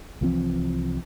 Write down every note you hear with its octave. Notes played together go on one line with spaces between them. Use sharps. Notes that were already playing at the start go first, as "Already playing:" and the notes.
C2 E3 F3 C4